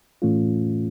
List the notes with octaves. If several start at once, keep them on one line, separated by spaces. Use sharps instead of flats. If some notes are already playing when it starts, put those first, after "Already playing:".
A2 E3 A3 C#4 F4